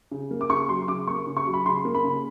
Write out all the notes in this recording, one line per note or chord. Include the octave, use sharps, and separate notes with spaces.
C#3
A#3
D6
C#3 C#6
F#3 C6
C#3 D6
A#3 C#6
C#3
C#6
F#3
B5
C#3 C6
A#3
B5
C#3